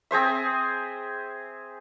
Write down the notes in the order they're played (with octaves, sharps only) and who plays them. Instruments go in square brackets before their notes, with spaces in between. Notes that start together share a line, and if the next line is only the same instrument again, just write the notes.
[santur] C4 G#4 C5 E5